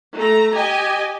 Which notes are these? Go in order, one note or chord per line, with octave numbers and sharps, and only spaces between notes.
A3 A#5
G4 D#5 G#5